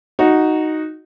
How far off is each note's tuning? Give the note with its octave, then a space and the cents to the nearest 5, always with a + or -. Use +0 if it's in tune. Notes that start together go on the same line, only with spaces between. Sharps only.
D#4 +0 F#4 +0